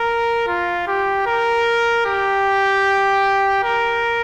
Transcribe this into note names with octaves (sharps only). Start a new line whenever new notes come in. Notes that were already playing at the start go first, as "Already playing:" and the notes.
Already playing: A#4
F4
G4
A#4
G4
A#4